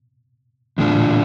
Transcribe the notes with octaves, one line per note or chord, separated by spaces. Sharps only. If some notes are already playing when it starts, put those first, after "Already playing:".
E2 A2 D3 A3 D4 F4
A#2